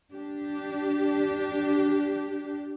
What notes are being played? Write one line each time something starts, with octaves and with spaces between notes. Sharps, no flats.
D4 G4